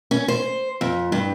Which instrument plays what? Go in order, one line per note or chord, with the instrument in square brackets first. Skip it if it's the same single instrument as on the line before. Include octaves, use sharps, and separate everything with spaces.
[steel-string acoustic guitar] C#4
C5
F2
G2